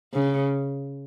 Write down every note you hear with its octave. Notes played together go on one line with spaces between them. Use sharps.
C#3